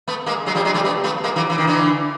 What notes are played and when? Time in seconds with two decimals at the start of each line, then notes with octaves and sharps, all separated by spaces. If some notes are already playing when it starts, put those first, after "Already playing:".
0.08 A3 B3
0.26 G#3 A#3
0.46 F#3 G#3
0.55 F3 G3
0.65 F#3 G#3
0.74 G3 A3
0.84 A3 B3
1.04 A3 B3
1.24 G#3 A#3
1.36 E3 F#3
1.50 E3
1.58 D#3
1.67 D3 E3